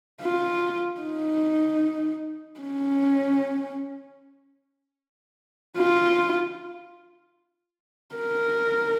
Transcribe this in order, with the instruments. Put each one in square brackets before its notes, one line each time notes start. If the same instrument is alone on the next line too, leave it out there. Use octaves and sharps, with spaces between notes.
[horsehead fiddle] F4
D#4
C#4
F4
A#4